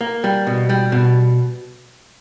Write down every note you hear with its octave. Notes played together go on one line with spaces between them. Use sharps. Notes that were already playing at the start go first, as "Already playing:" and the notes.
A#3
G3
B2
G3
B2